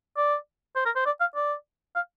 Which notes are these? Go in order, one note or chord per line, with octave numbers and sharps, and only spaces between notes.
D5
C5
A#4
C5
D5
F5
D5
F5